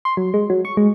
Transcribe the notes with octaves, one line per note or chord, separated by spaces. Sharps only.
C6
F#3
G#3
F#3
C#6
G#3